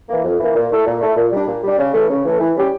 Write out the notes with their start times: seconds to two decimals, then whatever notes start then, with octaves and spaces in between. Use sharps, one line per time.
0.09 E3 A#3
0.24 F2
0.39 E3 A#3
0.55 A#2
0.71 A3 E4 A4
0.86 A#2
1.01 A3 E4 A4
1.16 A#2
1.32 G3 D4
1.47 A#2
1.63 G3 D4
1.78 C#3
1.94 E3 A3
2.10 C#3
2.25 E3 A3
2.40 E3
2.55 G3 C#4 G4